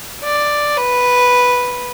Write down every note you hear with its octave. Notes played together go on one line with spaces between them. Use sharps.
D5
B4